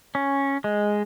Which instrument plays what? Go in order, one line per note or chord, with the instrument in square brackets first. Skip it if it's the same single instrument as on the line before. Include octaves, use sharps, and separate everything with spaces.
[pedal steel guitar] C#4
G#3